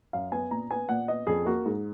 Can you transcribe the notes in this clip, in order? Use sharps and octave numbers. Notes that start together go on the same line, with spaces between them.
F#2 F5
B3 G#5
A#2 A#5
B3 G#5
A#2 F#5
B3 D#5
F2 G#4
A#3 F#4
G#2